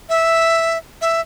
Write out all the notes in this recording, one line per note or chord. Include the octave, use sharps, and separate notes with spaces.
E5
E5